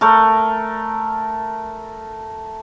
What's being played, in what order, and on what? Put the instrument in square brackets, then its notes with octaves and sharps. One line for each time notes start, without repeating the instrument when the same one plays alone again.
[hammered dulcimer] A3 A#4